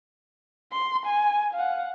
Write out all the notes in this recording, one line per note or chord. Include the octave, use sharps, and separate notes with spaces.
C6
G#5
F5 F#5